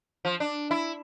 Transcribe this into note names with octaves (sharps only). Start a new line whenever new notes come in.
F3
D4
E4